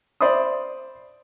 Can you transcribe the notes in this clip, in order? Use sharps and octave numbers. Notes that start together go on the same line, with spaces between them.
C5 D5 E5 B5 C6 D#6